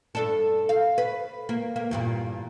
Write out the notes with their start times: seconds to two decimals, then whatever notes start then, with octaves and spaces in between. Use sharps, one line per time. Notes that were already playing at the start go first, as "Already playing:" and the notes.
0.15 G2 D4 A4
0.69 F5
0.98 B4
1.49 A#3
1.76 A#3
1.91 E2 G2 A#2